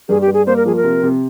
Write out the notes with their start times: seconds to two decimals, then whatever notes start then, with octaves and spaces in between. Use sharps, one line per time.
0.09 G2 G#4
0.21 G4
0.27 G2
0.34 G#4
0.47 A#3 C5
0.56 A#4
0.65 F3 G#4
0.76 A#4
0.84 C3
1.03 C3